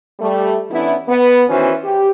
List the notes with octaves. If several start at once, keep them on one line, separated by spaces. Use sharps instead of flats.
G3 A3
E3 B3 C#4 D4 E4
B3
D#3 E3 C#4 F#4 B4 C5
G4